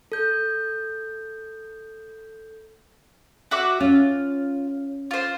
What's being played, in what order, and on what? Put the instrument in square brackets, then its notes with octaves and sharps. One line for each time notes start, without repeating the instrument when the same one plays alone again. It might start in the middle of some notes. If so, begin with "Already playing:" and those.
[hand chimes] A4 G6
[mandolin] F#4 E5 D6
[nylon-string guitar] C#4 [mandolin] F4
[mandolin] F4 C5